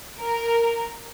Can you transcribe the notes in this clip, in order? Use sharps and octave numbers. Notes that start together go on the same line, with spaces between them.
A#4